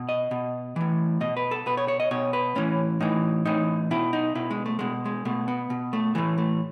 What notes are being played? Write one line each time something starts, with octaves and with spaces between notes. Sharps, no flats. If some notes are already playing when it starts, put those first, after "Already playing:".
Already playing: B2
D#5
B2
A2 E3
B2 D#5
B4
A4
B2 B4
C#5
C#5
D#5
B2 C#5
B4
A2 E3 C#4
A2 E3 D#4
A2 E3 D#4
B2 E4
D#4
B2 E4
G#3
A3
B2 G#3
G#3
B2 A3
B3
B2
A3
A2 E3 A3
A3